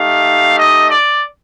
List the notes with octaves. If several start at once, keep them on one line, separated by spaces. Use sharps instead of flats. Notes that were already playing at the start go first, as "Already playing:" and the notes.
Already playing: A3 D#4 G4 F5
D#5
D5